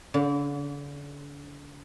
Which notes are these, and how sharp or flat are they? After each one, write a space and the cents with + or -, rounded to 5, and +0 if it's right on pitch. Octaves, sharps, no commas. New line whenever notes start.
D3 -40